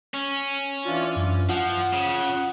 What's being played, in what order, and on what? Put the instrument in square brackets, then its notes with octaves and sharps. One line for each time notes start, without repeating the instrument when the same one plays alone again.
[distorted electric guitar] C#4
[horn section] E3 D4 F4
[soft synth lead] F#2
[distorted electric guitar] F3 [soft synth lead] F4 [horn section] F#5
[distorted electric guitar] C#3